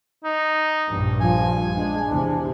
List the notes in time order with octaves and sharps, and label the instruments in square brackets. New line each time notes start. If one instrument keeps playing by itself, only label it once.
[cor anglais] D#4
[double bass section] A#1 G2
[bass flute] F3 [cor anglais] G#5
[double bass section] G#3 [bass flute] D4
[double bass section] E2 C3